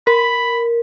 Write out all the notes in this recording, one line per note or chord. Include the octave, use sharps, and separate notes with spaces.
A#4 B5